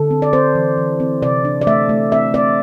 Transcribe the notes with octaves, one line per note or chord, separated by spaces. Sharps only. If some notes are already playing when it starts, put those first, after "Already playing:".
Already playing: D3 A4
C4
D5
C4 C5
E3
E3
C4
C3 D5
D4
D5
A3 E5
A3
C4 E5
C4 D5